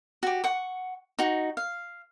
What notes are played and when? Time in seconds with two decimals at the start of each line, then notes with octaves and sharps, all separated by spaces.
0.23 F#4 G4
0.44 F#5 C#6
1.19 D#4 F#4
1.57 F5